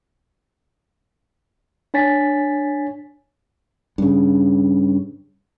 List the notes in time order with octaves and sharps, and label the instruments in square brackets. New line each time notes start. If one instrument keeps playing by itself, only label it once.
[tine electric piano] D4 C#5 G#5 A6 B6
[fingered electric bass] G2 C#3